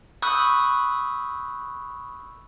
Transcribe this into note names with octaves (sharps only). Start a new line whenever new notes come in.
B5 C#6 D#6 E6 F#6 G6